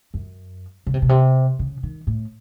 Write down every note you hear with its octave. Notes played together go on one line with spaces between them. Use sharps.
F#2
C#3
C3
B2
C3
C#3
D#3
A2